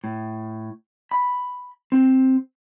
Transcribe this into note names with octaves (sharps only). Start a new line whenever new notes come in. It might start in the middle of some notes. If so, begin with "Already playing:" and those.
A2
B5
C4